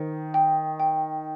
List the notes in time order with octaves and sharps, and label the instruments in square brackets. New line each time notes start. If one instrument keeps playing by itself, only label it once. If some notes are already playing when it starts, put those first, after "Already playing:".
Already playing: [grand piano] D#3 [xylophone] C5
[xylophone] G5
G5